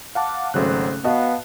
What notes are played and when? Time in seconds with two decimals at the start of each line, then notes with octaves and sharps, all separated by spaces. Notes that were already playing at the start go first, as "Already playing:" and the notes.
0.15 F5 F#5 A5 D6
0.54 G#1 C#3 F#3 A3 C5 F#6
1.04 B3 F#4 B4 D#5 F5 A5